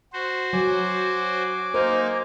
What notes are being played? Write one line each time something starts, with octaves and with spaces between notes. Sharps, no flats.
F#4 C5
F#3 G#5 D6
A#3 D#4 A#4 C5